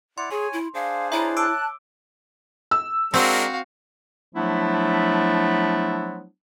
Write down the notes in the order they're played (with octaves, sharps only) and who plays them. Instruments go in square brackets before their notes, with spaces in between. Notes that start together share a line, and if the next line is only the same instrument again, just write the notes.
[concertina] E4 D5 F#5 [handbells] C6
[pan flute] G#4 [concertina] C#5 G#5
[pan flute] E4
[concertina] D4 G#4 C5 [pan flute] F5
[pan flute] E4 [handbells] C#5 E5 [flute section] A#5 B5
[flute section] A5 F#6 [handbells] D6 E6 D7
[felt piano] E6
[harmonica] G#3 D4 A#4 [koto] C4 [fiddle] F#4 F5
[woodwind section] F3 F#3 A3 B3 D4 E4